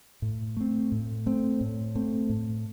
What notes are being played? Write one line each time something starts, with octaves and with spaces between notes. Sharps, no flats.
A2
A3 C4
A2
A3 C4
A2
A3 C4
A2